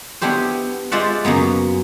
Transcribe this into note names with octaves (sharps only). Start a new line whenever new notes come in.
B3 D4 E4 G4 C5
G#3 F4 C5 D5 E5 F#5
F#2 C#3 A#3 B3